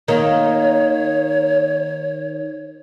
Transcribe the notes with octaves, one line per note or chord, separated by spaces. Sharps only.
D#3 A#3 C#5